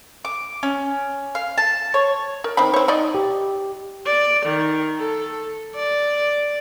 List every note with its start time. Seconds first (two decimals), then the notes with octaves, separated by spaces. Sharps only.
0.25 D6
0.63 C#4
1.35 F5
1.58 A5
1.94 C#5
2.44 A#4
2.57 D#3 C4 B5
2.74 C4 C#5
2.88 D#4 D5 D#5
3.15 G4
4.06 D5
4.46 D#3
4.98 A4
5.75 D5